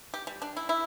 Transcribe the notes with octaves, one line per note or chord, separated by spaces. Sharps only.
G4
G3
D4
E4
E4